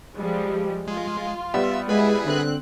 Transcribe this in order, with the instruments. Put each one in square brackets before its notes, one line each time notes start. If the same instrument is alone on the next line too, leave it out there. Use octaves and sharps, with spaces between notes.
[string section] F3 G3 G#3
[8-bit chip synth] G#3 [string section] F4
[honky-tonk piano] G3 B3 [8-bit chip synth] E5
[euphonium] G#3 [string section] E4 [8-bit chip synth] G#4 B4
[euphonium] D3 [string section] C4 F#6